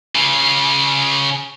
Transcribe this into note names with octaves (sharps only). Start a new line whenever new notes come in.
C#3 F4